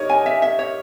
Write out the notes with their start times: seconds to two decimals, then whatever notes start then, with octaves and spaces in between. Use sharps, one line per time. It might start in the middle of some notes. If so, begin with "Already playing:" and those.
Already playing: D#4 G4 A#4 C#5 D#5
0.10 G#5
0.26 E5
0.42 E5
0.59 C#5